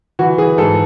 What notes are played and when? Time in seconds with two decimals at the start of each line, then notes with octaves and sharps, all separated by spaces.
0.19 E3 F#4
0.38 E3 G#4
0.58 G#2 A4